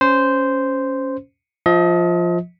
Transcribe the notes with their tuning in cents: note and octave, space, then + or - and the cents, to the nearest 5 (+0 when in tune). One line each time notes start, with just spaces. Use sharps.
C#4 +0 C5 -10
F3 +0 D#5 +35